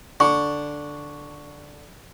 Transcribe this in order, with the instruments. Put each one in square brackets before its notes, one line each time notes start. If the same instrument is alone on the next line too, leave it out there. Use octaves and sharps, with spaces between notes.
[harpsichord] D3 [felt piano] C#6